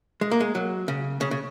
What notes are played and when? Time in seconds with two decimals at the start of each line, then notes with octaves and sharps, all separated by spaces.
0.21 G#3
0.31 A#3
0.41 G#3
0.55 F#3
0.88 C#3
1.21 C#3
1.31 C#3